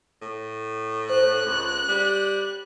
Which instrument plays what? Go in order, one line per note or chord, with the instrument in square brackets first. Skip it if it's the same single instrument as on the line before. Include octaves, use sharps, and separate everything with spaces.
[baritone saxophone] A2
[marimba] C5 [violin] F#6
[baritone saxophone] C#2
G3